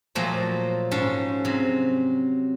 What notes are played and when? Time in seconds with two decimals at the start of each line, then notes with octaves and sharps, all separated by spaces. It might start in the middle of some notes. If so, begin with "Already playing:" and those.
0.15 A#2 F3 F#3 A3 C5
0.91 G#2 C#4 A5
1.45 C3 F#3